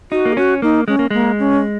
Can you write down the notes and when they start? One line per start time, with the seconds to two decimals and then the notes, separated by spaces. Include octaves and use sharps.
0.12 D#4 F#4
0.25 A#3
0.32 G#4
0.37 C#4 F#4
0.62 A#3 D#4
0.88 G#3 C#4
0.99 A#3
1.11 G#3 A#3
1.39 C#4